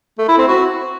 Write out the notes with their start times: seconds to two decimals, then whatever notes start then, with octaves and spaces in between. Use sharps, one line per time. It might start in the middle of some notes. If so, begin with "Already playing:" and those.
0.19 A3
0.28 E4
0.38 C4
0.48 F#4